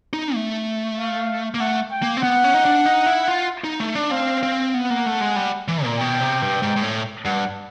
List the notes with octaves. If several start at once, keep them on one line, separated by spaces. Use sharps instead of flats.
D#4
A3
F5
A#3
A3 F#5
G5
A#3
C4
B3 F#5
C#4
D#4
D4
D#4
E4
F4
D#4
A3
D4
C4 F5
C4
B3 F#5
A#3
A3
G#3
G3
E3
A#2
B2 G5
C3
G2
G#2
G#2
A2
G2 F#5